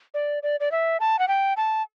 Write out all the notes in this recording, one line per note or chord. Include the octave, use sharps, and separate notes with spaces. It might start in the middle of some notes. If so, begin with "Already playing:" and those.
D5
D5
D5
E5
A5
F#5
G5
A5